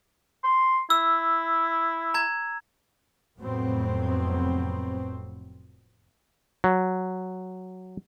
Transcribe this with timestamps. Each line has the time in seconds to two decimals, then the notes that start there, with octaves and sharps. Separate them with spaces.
0.44 C6
0.90 E4 E6
2.14 A#5 G#6
3.39 F1 F2 A2 F#3 B3 C4
6.64 F#3